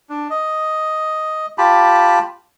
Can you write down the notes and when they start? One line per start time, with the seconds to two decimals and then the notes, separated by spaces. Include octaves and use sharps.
0.09 D4
0.30 D#5
1.58 F4 G4 A5 B5